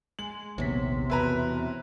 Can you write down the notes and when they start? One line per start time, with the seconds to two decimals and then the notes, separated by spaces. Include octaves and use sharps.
0.19 G#3 F#7
0.58 A#1 D#2 C3 B3 C#5 B6
1.10 E2 B2 E4 B4 A#5